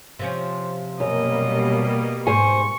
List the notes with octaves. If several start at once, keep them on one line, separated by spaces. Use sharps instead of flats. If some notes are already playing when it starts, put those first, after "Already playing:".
C3 F3 C#4
F#2 B2 G3 A#3 D#5
G#2 C5 G#5 C#6